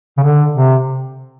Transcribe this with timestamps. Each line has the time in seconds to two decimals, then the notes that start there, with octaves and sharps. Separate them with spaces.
0.18 C#3
0.23 D3
0.54 C3